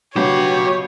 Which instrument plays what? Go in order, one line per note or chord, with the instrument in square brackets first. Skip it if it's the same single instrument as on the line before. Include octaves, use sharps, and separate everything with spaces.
[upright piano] C#3 F#3 D4 [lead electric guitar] F#4 B4 [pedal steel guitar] G4 [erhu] C#5